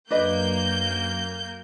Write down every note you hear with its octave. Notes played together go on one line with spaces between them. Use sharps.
F#2 A#3 D4 B4 D#5 G6